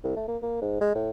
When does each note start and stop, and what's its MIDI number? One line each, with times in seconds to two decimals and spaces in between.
0.03 0.15 36
0.16 0.23 57
0.28 0.37 58
0.42 0.60 58
0.61 0.76 44
0.81 0.92 56
0.95 1.10 45